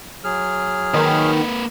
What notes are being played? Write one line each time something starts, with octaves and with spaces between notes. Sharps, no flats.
F#3 G#4 F6
D#3 A#3 B4